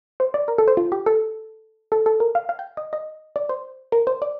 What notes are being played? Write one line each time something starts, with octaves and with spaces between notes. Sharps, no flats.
C5
D5
A#4
A4
C5
F4
G4
A4
A4
A4
A#4
F5
F5
G5
D#5
D#5
D5
C5
A#4
C5
D5